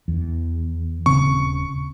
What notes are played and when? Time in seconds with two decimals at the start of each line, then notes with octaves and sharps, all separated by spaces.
0.08 E2
1.06 D#1 C#3 C4 C#6